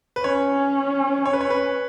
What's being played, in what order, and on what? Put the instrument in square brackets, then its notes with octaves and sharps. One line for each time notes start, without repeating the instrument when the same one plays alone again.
[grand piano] B4
[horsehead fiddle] C#4 [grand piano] C#5
[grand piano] C#5
B4
C#5
B4